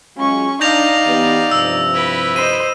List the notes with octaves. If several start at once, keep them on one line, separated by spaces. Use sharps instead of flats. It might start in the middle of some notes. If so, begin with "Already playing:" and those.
F#3 G#3 C#4 F4 C#6
D4 D#4 D5 F5 G6 A#6 F7
E3 B3 G4
G2 C3 F3 E6
E4 B4
C5 D#5 D#7